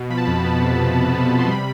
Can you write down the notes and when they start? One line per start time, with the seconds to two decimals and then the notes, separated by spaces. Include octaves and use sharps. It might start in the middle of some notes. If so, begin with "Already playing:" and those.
Already playing: B2
0.10 F3 B5
0.18 A5
0.25 F2 B5
0.45 B3
0.61 C3
0.79 F3
0.96 F2
1.13 B3
1.30 C3
1.38 C6
1.48 G3 B5